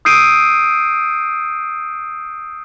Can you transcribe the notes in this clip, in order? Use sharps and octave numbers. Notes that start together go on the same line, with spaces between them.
D#6 E6 G6 C7 D7 D#7